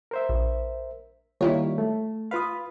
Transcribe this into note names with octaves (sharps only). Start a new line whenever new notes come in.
A#4 C5 E5
A#1
D#3 G3 A#3 E4 F4 C#5
A3
F4 B4 F5 B5 D#6